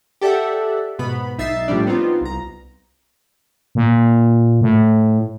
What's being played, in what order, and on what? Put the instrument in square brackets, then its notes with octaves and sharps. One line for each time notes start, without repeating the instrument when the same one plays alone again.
[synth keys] G4 A4 D5 E5 F#5
G#2 B2 B3 B5
B1 D#4 E5 A6 C7
A2 F3 G3 D4
B3 C4 D#4 F4
C2 A#5
[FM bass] A#2
A2